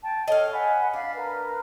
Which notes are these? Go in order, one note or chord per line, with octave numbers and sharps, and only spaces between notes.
G5 A5
A4 C#5 D#5 F5 G5
F#5 G#5 B5
D4 F5 B5
A#4 B4